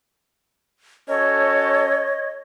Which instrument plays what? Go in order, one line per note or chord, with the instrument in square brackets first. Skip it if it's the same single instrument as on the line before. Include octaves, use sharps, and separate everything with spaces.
[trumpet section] C#4 F#4 A4 [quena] C#5 [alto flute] D#5